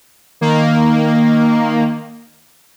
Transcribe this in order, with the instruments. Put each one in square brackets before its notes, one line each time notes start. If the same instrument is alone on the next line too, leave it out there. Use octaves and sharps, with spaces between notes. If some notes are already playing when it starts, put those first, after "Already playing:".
[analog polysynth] D#3 A#3